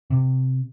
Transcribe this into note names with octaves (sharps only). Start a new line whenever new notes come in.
C3